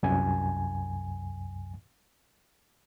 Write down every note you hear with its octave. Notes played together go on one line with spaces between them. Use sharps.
C2 F#2 G#5